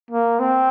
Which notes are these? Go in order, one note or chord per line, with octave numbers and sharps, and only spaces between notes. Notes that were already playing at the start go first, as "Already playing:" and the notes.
A#3
C4